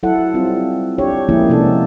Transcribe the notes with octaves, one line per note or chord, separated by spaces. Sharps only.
F#3 E4 A4 F#5
G3 C4 F4
D4 G4 C#5
F3 G#3 A#3 C#4 E4 G#4
C3 G#3 A#3 B3 D4 A4